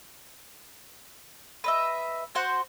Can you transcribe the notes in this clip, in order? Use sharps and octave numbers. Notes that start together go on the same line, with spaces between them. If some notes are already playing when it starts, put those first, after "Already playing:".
B4 D#5 E5
F#4 C5 F#5